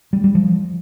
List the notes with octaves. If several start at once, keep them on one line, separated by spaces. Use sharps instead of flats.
G3
G3
F3